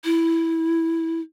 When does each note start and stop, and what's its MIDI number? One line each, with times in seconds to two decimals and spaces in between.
0.04 1.21 64